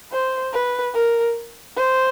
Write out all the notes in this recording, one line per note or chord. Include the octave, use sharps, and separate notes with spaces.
C5
B4
A#4
C5